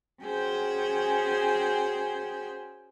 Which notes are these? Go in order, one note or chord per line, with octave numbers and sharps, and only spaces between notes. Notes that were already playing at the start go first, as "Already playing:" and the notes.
C#4 F#4 G#4 C5 G5 G#5